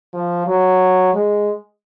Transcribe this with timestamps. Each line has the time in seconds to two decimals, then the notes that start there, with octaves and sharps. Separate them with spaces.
0.13 F3
0.47 F#3
1.14 G#3